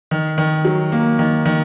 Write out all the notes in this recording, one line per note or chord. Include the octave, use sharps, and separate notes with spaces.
D#3
D#3
F#3
A#3
D#3
D#3